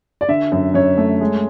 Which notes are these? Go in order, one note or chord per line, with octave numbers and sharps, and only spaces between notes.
D5
D3 E5
F#2
F#2 C#5
A3
G#3